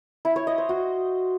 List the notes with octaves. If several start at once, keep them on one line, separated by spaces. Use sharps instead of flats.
E4
C#5
D#5
C5
F#4